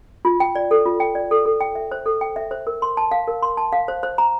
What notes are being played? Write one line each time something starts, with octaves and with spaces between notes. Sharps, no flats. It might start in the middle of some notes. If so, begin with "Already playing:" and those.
F4
G5
D5
A4
F4
G5
D5
A4
A4
G5
E5
C5
A4
G5
E5
C5
A#4
C6
A5
F5
A#4
C6
A5
F5
C5
C5
A#5